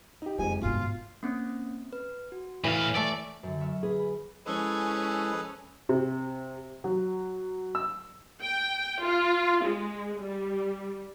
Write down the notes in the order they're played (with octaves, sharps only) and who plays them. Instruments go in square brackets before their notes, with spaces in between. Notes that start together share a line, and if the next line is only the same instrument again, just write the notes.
[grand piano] D#4 G4
[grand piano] F#1 F2 [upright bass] G#3 [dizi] G#5
[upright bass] G1 G#2 [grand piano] B2 [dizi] F4
[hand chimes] A#3 C4 C#4
B4
F#4
[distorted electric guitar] A2 F5 [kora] E3 [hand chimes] B6
[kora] A3 A4 E5 [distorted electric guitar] D5
[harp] F#2 D3
E5 C#6 F6
[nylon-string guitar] G#4 B4
[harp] B5
[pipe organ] F3 G#3 E4 [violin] C#4 [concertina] G#4 A4 B4
[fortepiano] C3
F#3
E6
[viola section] G5
F4
G#3
G3